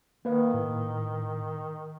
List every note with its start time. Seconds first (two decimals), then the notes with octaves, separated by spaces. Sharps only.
0.25 D#3 A#3 B4 F5
0.54 A2